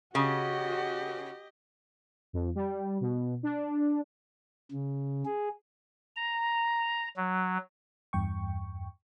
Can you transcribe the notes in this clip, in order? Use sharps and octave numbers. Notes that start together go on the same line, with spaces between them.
C#3 F#4 G4 D#5
F2
G3
B2
D4
C#3
G#4
A#5
F#3
E2 G2 G5 C#6